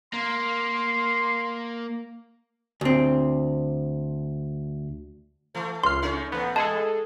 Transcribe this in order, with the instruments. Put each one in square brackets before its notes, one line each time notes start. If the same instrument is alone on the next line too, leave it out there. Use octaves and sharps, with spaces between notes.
[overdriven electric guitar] A#3 [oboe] C6
[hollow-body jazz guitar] D2 C4
[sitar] E3 A3
[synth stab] C#2 C7 [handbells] C6 F6
[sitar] A3 C#4 D#4
[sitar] A2 E3 [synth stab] B3
[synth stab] G#3 G#4 A4 [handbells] A5